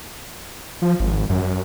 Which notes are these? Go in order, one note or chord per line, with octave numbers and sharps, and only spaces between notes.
F3
G#1
F#2